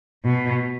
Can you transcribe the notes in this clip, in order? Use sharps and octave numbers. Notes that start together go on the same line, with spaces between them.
B2